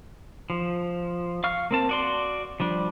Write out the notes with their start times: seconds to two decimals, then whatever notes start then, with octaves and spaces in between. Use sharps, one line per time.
0.50 F3
1.44 F5 C#6 F6
1.71 A#3 C4 A5
1.89 F#4 D5 C6
2.60 F3 G3 D4